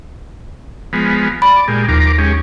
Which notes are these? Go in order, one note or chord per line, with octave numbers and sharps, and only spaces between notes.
F3 G#3 B3
D5 B5
A#2 G#3 G4
D#2 F3 A#4 D6
G#3 C#4 G4